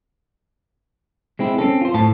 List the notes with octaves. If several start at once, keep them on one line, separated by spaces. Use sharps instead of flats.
G#3 C4 E4
C4 C#4 A4
F4 C5
A2 C5 A5